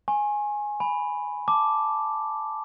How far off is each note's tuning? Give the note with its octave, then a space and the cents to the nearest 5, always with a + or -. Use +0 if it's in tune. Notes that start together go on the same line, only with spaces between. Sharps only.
G#5 +0 C#6 -45
G#5 +0 B5 +0
A5 +0 D6 +0